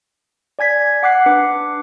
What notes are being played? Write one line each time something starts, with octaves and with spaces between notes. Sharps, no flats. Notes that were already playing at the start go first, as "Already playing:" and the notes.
D5 G#5 G#6 B6
F#5 D6 F#6 C7
D4 B4 D6 C#7